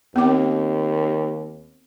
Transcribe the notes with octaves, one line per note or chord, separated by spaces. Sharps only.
D#2 B3 C4 D6